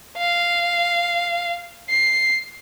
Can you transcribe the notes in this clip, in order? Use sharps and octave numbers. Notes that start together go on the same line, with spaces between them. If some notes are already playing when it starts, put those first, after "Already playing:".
F5
C7